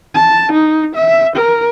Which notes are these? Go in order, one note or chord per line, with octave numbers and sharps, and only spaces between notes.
A5
D#4
E5
A#4